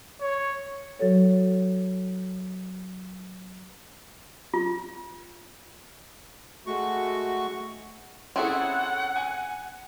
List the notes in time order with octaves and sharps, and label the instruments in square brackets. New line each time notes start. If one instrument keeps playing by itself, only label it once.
[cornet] C#5
[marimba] F#3 F#4 A4 C#5
[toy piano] F4
[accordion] G#3 A3 F#4 C#6
[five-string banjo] C4 E4 G#4 [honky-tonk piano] C#4 A4 C6 [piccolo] F#5
[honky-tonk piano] G#5 F#6 C#7